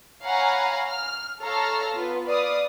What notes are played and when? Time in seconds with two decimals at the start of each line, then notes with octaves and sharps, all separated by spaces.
0.25 C#5 F5 F#5 G#5 A#5 B5
0.87 F6
1.42 A4 C#5 F5 A5 A#5 F6
1.95 B3 F4 B4
2.27 B4 D5 F5 D#6